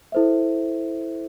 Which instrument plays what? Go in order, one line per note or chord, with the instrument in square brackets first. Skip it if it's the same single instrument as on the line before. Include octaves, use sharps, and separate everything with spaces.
[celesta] E4 A4 C5 E5